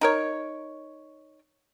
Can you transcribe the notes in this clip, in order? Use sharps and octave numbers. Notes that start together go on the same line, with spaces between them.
D#4 A#4 C#5